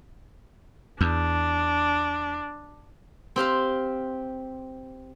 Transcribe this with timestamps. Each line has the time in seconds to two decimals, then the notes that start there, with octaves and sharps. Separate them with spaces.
1.01 E2 D4
3.36 C4 G4 F5 C6